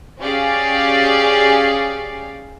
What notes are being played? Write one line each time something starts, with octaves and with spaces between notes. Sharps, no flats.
C#4 G4 G#4 D5 F5